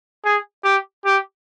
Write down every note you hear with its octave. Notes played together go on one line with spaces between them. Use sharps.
G#4
G4
G4